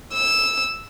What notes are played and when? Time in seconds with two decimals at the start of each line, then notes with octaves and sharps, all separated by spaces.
0.14 E6